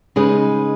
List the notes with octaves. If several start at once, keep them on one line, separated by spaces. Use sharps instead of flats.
C#3 G#3 D#4 G#4 B4